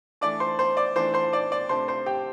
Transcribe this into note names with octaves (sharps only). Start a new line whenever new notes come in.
E3 A3 D4 D5 D6
C5 C6
C5 C6
D5 D6
E3 A3 D4 C5 C6
C5 C6
D5 D6
D5 D6
C3 A3 D4 C5 C6
C5 C6
G4 G5